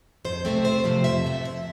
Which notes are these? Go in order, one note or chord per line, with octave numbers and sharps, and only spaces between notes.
F2 C5
C3 F3 A3 C4
F2 C5
C3 F3 A3 C4
F2 E5
C3 F3 A3 C4
F2 E5